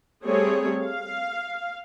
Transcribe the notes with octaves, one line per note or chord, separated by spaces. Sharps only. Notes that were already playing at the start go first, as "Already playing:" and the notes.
G3 A3 C4 G#4 C#5
F5